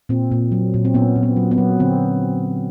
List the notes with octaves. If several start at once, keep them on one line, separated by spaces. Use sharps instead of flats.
A#2 C4
A#2
F#3
A#2
C4
A#2 B3 C#4
A#2
B3
F#3
B3
F#3
D3 C4